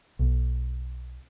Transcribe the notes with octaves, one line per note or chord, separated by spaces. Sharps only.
B1